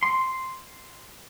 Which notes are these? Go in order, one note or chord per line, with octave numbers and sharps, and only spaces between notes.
C6